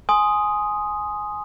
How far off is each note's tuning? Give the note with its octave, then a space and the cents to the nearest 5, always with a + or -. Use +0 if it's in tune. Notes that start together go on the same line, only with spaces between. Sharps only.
G#5 +10 C6 +0 D#6 +0